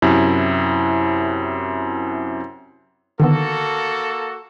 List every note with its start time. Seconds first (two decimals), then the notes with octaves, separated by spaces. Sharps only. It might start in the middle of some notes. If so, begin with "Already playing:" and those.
0.02 F#2 C3 E4
3.20 D3 D#3 A#3 B3 F#4 A4